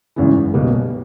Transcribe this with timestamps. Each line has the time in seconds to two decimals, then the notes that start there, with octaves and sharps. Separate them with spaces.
0.16 G#1 F#2 C#3 E3
0.54 B1 B2 G3 A#3